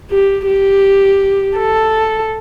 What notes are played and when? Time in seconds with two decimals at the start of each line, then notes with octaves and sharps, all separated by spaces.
0.11 G4
0.46 G4
1.57 A4